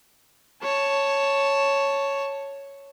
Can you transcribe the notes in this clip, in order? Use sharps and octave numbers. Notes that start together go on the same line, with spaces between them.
C#5 A5